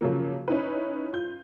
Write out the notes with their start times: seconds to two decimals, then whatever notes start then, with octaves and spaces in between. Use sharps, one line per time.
0.01 C#3 F3 F#3 A#3
0.48 C#4 D#4 E4 B4
1.13 F4 G6